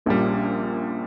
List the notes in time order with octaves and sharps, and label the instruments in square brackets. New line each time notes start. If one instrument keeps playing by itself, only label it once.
[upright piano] A#1 A#2 G3 [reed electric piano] A#3 C#4